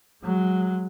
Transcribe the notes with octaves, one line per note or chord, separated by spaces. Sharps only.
F#3 G#3